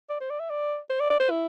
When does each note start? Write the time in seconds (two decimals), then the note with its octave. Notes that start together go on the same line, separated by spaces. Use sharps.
0.10 D5
0.21 C5
0.30 D5
0.40 E5
0.50 D5
0.90 C5
1.00 D5
1.10 D5
1.20 C5
1.30 E4